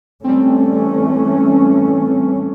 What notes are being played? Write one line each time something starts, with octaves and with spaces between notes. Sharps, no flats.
E3 G3 A3 C4 C#4